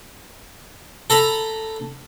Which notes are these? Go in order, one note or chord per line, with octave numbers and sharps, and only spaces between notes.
A4 A#5 B5